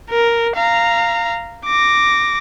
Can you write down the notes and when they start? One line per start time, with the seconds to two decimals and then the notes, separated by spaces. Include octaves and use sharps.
0.10 A#4
0.56 F5 A#5
1.65 D6 A#6